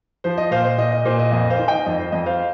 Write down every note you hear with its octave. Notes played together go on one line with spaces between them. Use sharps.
F3 C5
D#5
A#2 C5 F5
C5
A#2 D#5
D#5
A#2 C5
D#5
F2 D#5
C5 F5
D#3
D#5 G5
F2 D#5
C5
F2 D#5
C5 F5